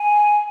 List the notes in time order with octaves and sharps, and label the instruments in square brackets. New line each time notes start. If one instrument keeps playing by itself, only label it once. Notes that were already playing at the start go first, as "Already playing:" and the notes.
Already playing: [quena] G#5